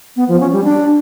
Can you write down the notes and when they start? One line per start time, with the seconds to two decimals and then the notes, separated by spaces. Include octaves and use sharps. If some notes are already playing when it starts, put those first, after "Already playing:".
0.16 B3
0.28 F3
0.40 C#4
0.52 G3
0.64 D4